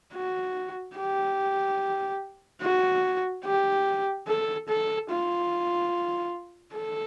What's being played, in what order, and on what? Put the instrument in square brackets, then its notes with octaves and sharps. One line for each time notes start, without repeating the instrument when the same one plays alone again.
[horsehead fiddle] F#4
G4
F#4
G4
A4
A4
F4
A4